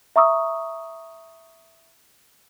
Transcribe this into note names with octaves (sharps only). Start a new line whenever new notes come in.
E5 A#5 C#6 D#6 E6